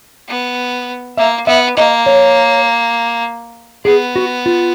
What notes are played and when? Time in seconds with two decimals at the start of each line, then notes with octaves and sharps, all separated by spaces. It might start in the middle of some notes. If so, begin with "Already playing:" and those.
0.28 B3
1.17 A#3 E5
1.47 B3 E5
1.77 A#3 D#5
2.06 C#5
3.85 B3 G#4
4.16 F#4
4.46 F4